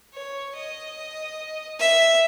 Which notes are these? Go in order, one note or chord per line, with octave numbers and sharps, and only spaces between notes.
C#5
D#5
E5